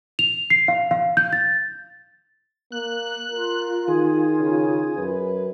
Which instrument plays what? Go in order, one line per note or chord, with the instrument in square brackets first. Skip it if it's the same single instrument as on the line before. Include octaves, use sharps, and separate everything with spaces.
[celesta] F7
C7
F5
F5
G6
A6
[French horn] A#3 [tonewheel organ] F#6
[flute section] F4 [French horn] A#4
[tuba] D#3 [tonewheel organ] G#4
[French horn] C#3
[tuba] F#2 [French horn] B4